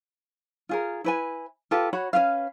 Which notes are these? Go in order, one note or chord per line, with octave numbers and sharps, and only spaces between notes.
F4 G#4 A#4
E4 B4 G#5
F4 G4 A4 B4
F#4 C#5 B5
C#4 F4 B4 F5